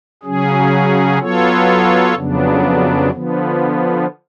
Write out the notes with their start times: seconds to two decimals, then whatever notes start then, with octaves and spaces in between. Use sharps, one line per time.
0.23 C#3 F#3 C#4 G#4
1.19 F#3 B3 F4 A4 C#5
2.14 F2 C#3 F#3 B3 D4
3.10 D3 F3 B3